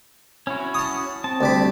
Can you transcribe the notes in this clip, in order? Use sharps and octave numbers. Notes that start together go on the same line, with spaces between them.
C#4 E4 F#4
A5 D#6
C4 A5
D2 G3 B5